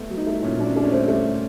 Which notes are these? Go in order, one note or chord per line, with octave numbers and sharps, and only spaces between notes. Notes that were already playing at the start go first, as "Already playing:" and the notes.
Already playing: A3 B3
F#3
D#4
A3 E4
A#2 C#4
F#3 D4
C#4
A3 D4
C#4
A3 C4
A3